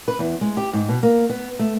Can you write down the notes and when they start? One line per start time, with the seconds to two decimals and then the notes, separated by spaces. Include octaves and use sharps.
0.08 B4
0.19 E2
0.41 G#3
0.57 G4
0.73 G#2
0.89 B2
1.03 A#3
1.29 B3
1.59 A3